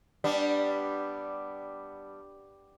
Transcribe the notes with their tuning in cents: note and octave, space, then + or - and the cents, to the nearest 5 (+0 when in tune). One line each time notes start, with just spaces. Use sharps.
G3 +0 B3 +0 D4 +0